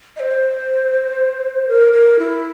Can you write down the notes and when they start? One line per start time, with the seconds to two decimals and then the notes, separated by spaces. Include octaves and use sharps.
0.16 D#5
0.20 C5
1.68 A#4
1.93 A#4
2.19 E4